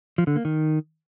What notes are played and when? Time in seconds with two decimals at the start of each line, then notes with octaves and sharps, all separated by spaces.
0.18 F3
0.27 D3
0.36 A#3
0.45 D#3